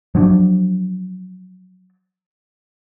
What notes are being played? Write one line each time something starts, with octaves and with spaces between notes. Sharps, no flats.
F3 F#3 B3 D4